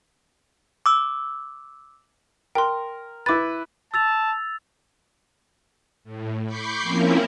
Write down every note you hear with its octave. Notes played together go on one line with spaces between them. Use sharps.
D6 E6
A#4 G5 C6
E4 B4 D6 A6
A5 E6 A6 F7
A2
B5 C#6 D6 G6 C7
F3 A#3 C4 C#4 E4 A#4